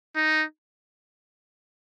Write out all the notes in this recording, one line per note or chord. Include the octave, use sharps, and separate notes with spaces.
D#4